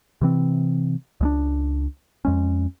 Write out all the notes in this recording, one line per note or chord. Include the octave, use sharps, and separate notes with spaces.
C3 E3 C4
C#2 G#3 D4
F2 G#3 C#4